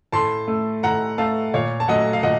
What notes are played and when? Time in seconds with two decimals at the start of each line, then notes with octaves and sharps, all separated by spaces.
0.12 A2 A5 C6
0.48 A3
0.83 A2 F#5 A#5
1.18 A3 F5 A5
1.54 A#2 C#5 F5
1.80 A5
1.88 F#3 A3 D#5 F#5
2.13 F5
2.23 A#2 D#5 F#5